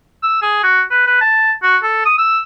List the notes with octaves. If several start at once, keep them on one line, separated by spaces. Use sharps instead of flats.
E6
G#4
F#4
B4
B4
A5
F#4
A4
D#6
E6